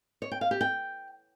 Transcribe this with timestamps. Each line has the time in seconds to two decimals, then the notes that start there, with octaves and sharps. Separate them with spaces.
0.22 C#5
0.32 G5
0.41 F5
0.51 G4
0.61 G5